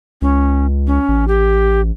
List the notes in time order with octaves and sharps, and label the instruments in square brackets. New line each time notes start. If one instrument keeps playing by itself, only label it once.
[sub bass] C#2 [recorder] C#4
[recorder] C#4
[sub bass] A1
[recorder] G4